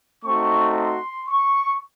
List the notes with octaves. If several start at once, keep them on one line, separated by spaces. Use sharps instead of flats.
A3 C4 D#4 F#4 C#6
C6
C#6